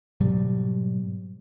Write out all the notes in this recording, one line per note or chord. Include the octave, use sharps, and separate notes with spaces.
G#2 B2 F#3 G3